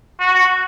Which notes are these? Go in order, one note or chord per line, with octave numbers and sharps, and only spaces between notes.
F#4